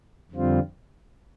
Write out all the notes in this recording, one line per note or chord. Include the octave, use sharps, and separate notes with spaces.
F2 D3 G3 C4 F4